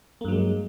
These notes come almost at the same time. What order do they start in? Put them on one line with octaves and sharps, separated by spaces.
A#3 G2 F#3 G#3